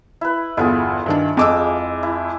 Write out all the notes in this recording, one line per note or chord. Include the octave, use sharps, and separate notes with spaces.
E4 B4
G1 E2 E4 F4 G#4
G2 D#3 D4
F2 G#3 D6 E6
E4